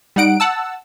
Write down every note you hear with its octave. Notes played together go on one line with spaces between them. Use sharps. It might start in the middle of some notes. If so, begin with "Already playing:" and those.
G3 D#4 F#5 D7
F#5 A5 E6